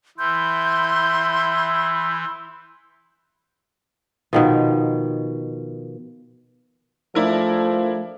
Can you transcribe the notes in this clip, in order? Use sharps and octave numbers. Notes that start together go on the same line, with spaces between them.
E3 E4 C6 G6
B2 D#3 F3
F3 A3 D4 E4 A#4